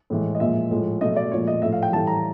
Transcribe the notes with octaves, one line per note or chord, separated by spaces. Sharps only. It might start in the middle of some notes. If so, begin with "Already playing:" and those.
A2 E3 G#3
D#5
A#2 F3 G#3 E5
A2 F3 G#3
B2 F#3 A3 D#5
D5
A#2 F3 G#3 C#5
D#5
A2 F3 A3 E5
F5
G5
A2 E3 G3 A5
A#5